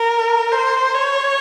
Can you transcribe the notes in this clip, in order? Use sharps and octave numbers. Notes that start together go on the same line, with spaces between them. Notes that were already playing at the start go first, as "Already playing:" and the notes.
Already playing: A#4
C5
C#5